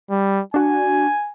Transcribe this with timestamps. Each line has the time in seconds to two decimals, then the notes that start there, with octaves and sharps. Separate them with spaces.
0.10 G3
0.54 D4 F#4 G#5